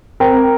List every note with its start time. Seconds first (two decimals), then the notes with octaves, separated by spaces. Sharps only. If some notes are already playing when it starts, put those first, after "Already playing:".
0.20 C4 A#4